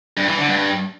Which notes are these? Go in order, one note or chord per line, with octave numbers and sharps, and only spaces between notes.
G2
E3
D3
G2